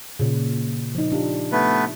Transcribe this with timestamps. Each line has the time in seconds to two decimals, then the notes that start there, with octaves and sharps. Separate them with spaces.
0.19 A#2 C#3
0.95 F3 D#4
1.12 D4 F4 G4
1.52 A3 B3 B4